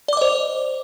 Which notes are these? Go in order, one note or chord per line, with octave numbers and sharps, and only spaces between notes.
C5 D5 D#5 D6